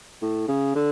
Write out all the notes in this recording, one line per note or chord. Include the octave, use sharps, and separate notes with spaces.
A2
C#3
D3